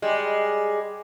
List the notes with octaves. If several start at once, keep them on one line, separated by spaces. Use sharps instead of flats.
G3 G#3